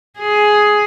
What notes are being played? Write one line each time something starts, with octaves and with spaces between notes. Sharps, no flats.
G#4